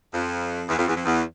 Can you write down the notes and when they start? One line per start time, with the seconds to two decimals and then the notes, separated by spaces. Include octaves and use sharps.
0.14 F2
0.69 E2
0.78 F2
0.87 E2
0.96 F2
1.05 E2